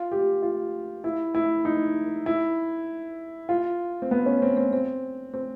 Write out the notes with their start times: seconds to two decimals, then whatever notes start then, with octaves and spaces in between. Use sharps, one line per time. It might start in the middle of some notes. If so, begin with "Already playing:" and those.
Already playing: F4
0.12 G4
0.42 F4
1.04 E4
1.35 E4
1.65 D#4
2.26 E4
3.49 F4
4.02 C4
4.11 B3
4.26 C#4
4.42 C4
4.57 C4
4.73 C4
5.34 C4